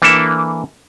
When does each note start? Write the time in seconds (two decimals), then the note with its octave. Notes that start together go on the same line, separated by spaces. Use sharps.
0.02 E3 A#3 D4 A4 E5